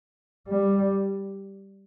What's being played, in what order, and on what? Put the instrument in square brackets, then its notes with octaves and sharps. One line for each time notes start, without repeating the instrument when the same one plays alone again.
[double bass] G3